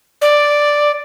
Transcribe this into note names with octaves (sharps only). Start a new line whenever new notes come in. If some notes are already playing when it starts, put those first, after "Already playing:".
D5